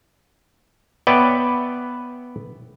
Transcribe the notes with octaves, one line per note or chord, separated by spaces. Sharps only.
B3 B4 C#5 D5 E5 G5